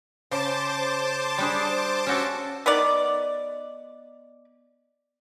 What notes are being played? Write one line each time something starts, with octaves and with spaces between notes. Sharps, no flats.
C#3 C5 A5 D6
G3 D4 G#4
C#4 F#4 A4
B3 D#4 A#4 D5